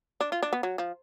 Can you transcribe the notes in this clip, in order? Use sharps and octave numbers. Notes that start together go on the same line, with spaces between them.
D4
F4
D4
B3
F#3
F3